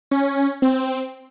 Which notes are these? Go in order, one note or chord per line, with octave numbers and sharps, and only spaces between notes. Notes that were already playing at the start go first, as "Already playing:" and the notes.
C#4
C4